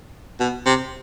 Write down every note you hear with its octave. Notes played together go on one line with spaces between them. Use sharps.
B2
C3